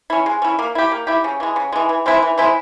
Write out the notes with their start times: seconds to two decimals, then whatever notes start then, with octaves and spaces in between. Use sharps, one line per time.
0.10 C#4 E4
0.26 G#3
0.42 C#4 E4
0.59 A#3
0.75 E4 G4
0.91 A#3
1.07 E4 G4
1.24 C#3
1.40 E3 G#3
1.56 C#3
1.72 E3 G#3
1.89 E3
2.06 G#3 C4 E4
2.22 E3
2.38 G#3 C4 E4